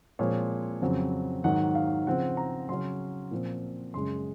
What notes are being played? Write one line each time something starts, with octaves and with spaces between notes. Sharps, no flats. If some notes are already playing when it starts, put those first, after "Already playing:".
A#2 F3 G#3 C4 C#5
F2 C#3 F#3 C4
G#2 D#3 F#3 F#5
F5
C#3 F3 C4 F#5
A#5
C#3 F#3 C#4 C6
A#2 F3 C4
F#2 C#3 G#3 C6